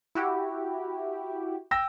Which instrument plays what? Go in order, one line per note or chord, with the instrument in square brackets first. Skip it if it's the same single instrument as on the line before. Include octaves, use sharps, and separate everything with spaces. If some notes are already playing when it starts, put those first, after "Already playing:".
[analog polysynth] E4 F#4 G4
[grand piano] G5 E6 A#6